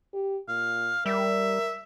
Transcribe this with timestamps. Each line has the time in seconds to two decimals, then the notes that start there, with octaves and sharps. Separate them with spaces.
0.14 G4
0.48 A#2 F5
1.06 G3 A#4 E5